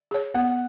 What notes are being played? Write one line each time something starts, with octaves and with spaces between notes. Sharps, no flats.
G#4 C#5
B3 F#5